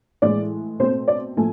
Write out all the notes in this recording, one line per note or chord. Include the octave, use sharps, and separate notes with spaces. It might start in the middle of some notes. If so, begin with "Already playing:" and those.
A2 E3 G#3 D5
B2 A3 C4 C5
D5
A2 F3 A3 G#5